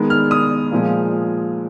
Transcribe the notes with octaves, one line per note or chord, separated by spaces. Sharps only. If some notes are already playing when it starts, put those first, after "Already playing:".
Already playing: D#3 G#3 B3
F6
D#6
A#2 F3 G#3